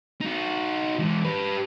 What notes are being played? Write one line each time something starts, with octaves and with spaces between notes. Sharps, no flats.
D#4 F#4
E3 G#3
G4 B4